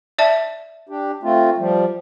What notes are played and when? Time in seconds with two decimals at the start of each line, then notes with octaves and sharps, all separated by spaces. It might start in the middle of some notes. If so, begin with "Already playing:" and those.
0.18 D5 E5 A5
0.89 D4 G4
1.23 A3 C4 F4
1.58 F3 G3